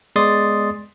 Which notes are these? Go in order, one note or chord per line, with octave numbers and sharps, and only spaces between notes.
G#3 B3 D5 C6 D#6 A6